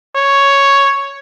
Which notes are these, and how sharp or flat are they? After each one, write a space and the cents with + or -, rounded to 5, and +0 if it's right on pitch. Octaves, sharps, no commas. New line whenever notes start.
C#5 +0